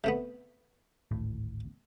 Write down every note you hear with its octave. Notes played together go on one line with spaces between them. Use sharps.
C3 A3 B3
D1 G#1 A2